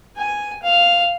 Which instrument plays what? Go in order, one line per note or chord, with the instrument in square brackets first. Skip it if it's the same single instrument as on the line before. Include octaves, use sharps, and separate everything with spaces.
[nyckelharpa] G#5
F5